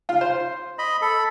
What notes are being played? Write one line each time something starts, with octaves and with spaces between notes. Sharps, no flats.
F4
C5
D#5 B5
A4 B5